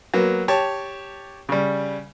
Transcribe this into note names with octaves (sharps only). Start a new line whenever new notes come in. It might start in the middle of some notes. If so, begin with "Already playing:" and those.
F#3 A#3 B3
G4 C#5 A5
C#3 G3